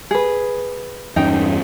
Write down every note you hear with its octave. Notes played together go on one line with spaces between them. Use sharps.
G#4 B4
E2 G2 C#4 D#4 G5